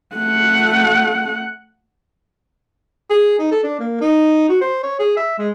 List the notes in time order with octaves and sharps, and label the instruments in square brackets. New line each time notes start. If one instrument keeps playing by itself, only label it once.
[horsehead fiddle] A3 F#5
[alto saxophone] G#4
D#4
A4
D4
A#3
D#4
F#4
C5
C#5
G#4
E5
G#3